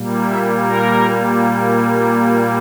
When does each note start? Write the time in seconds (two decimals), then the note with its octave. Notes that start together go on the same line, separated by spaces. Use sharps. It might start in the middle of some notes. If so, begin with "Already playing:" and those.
Already playing: A#2 G3 A#3
0.27 E5
0.63 A#4